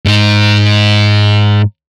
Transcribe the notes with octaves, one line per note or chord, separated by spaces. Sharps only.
G#2 D#4